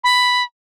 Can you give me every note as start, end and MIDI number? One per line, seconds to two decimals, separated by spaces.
0.04 0.43 83